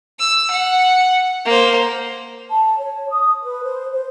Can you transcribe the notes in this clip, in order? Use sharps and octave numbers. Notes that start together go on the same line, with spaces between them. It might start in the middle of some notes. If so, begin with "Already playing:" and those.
E6
F#5
A#3 C5
A5
C#5
D#6
B4
C5
C5